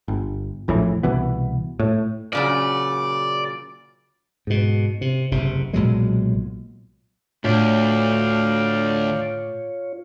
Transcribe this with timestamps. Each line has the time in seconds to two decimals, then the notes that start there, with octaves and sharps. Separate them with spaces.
0.08 G1
0.68 A#1 F2 A2 E3
1.03 C2 B2 E3 B3
1.79 A2
2.33 A#2 C#3 F#3 D5
4.47 G#2 B2
5.01 C3
5.31 F#1 C3
5.73 B1 A#2 F#3 G#3
7.44 D2 A2 F4 C#5 D5 F5 G5